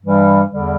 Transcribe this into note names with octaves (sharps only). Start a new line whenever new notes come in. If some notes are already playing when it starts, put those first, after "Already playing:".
G2 E3 G3
E2 D3 G3